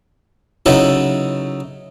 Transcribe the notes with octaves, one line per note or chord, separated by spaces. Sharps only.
C#3 F#3 D#4 E4 A4 B4